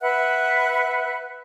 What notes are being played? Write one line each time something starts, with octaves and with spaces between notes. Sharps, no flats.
B4 E5 F#5 F#6